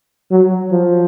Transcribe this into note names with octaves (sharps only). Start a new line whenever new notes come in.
F#3
F3